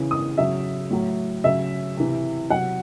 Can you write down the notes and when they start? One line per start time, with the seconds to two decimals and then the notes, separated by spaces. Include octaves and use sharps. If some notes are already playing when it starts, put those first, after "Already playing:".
Already playing: C#3 E3
0.11 D#6
0.38 C#3 F#3 E5
0.90 A2 F#3
1.44 C#3 F#3 E5
1.97 C3 E3
2.50 C3 F#3 F#5